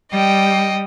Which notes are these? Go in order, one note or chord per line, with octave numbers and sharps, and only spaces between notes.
G3 D#5 G5